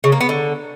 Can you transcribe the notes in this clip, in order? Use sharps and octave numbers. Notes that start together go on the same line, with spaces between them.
C#3
A#3
B3
D3